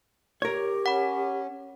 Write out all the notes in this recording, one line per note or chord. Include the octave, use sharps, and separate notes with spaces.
G4 A#4 C#5
C#4 F#5 B5